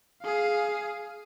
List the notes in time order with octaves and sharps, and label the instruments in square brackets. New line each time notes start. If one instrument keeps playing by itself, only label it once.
[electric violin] G#4 F5